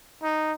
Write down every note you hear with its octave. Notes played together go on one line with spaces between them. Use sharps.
D#4